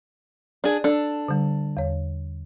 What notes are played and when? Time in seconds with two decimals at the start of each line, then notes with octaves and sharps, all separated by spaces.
0.64 D4 G#4
0.84 D4 A4
1.28 D3 G3
1.77 E2 C#5